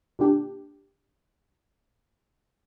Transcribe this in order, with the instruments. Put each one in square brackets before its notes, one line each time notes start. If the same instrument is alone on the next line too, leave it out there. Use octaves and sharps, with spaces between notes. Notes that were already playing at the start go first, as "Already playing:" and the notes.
[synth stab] A#2 D3 D4 G4